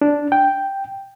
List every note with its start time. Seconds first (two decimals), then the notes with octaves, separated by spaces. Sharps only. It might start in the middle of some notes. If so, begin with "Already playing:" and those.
0.01 D4
0.32 G5